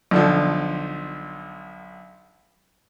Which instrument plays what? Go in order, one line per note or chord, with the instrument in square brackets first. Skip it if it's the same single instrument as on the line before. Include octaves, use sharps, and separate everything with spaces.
[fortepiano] B1 D3 F3